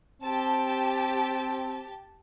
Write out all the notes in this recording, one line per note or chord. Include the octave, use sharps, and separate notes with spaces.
C4 G4 A5